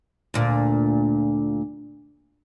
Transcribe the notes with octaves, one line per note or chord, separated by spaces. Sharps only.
D2 A#2